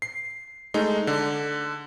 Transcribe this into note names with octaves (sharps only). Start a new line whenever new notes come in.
C7
G#3 A3 D#4
D3